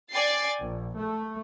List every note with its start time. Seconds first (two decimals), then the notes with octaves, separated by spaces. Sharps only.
0.11 D5 G5 G#5 A6 C7
0.60 A#1
0.97 A3